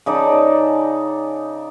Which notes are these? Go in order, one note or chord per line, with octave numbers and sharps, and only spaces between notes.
C#3 D#4 D5 A5